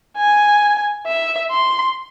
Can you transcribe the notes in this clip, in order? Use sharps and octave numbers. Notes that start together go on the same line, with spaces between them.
G#5
E5
C6